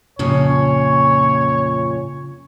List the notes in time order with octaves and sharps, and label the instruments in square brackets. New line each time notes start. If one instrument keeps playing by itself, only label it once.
[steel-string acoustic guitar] F2 A#2 C#4 [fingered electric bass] C#3 [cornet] C#5